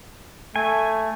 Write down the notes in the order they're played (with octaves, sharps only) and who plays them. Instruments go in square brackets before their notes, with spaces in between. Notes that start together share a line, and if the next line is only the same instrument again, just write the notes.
[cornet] A3 [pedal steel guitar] G#5